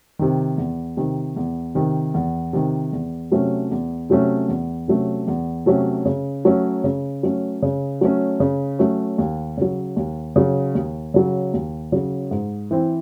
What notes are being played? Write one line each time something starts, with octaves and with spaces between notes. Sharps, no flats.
C3 D#3
E2
C3 D#3
E2
C3 D#3
E2
C3 D#3
E2
C3 F#3 A3 C#4
E2
C3 F#3 A3 C#4
E2
C3 F#3 A3 C#4
E2
C3 F#3 A3 C#4
C#3
F#3 A3 C#4
C#3
F#3 A3 C#4
C#3
F#3 A3 C#4
C#3
F#3 A3 C#4
D#2
C#3 F#3
D#2
C#3 F#3
D#2
C#3 F#3
D#2
C#3 F#3
G#2
E3 C4 E4